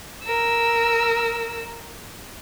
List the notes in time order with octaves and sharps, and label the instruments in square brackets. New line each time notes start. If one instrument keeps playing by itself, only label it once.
[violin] A#4 E6